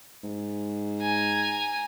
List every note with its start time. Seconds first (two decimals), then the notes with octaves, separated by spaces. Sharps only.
0.23 G#2
1.01 G#5 A#5